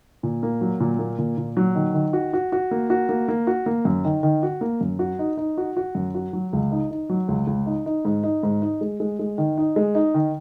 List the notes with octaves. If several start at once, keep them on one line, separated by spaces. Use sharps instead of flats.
A#2
A#3
F#3
A#2
A#3
A#2
A#2
F#3
D#3
D#3
F#4
F#4
F#4
A#3
F#4
A#3
A#3
F#4
A#3
F#2
D#3
D#3
F#4
A#3
F#2
F#4
D#4
D#4
F#4
F#4
F#2
F#4
F#3
C#2
D#4
D#4
F#3
C#2
C#2
D#4
D#4
G#2
D#4
G#2
D#4
G#3
G#3
G#3
D#3
D#4
G#3
D#4
D#3